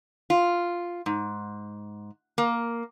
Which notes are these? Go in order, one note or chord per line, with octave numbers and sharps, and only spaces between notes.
F4
G#2
A#3